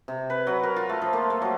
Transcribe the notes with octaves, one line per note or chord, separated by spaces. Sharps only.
C3
B4
F#3
A#4
F4
A3
F3
A#3
A3
F#3